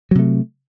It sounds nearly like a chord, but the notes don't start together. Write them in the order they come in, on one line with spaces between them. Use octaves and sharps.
F#3 C3 A3